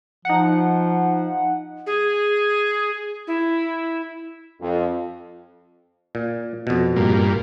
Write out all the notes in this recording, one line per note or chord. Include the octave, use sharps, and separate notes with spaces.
F3 D#4 F#5
G#4
E4
F2
A#2
F2 B2
G2 A#2